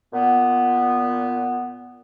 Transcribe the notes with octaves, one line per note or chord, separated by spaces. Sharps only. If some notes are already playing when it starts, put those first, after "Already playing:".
A#2 B3